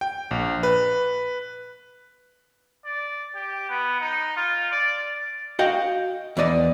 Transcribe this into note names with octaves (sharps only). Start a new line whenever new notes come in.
G5
A#1
B4
D5
G4
B3
D#4
F4
D5
F#4 D#5 F5 G5
E2 B4 D5 D#5